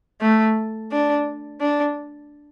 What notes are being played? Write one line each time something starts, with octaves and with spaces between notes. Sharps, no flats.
A3
D4
D4